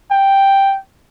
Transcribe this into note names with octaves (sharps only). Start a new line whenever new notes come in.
G5